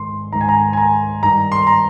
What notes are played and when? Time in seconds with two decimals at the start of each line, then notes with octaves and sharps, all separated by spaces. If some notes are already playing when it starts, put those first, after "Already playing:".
Already playing: G#2 D#3 C6
0.32 G#2 D#3 A#5
0.41 G#5
0.49 A#5
0.73 G#5
0.78 A#5
1.23 G2 D#3 A#5
1.52 C6
1.67 A#5